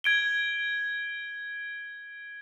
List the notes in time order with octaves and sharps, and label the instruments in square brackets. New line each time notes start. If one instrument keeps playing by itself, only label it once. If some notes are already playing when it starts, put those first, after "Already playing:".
[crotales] G#6 D7 G7